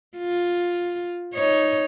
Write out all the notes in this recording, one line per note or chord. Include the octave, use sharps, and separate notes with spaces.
F4
D#4 C#5